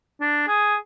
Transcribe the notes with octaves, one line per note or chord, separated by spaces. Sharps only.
D4
G#4